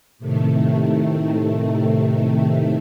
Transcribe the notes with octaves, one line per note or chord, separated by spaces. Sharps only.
A2 C3 D#3 A3